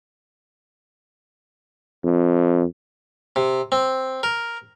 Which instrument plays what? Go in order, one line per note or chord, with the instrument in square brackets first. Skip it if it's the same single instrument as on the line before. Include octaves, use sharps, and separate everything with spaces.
[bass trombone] F2
[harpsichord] C3
C4
A#4